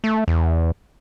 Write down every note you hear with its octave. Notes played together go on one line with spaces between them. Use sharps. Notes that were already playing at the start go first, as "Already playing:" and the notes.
A3
E2